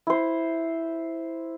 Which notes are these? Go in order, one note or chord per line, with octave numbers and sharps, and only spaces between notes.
E4 C5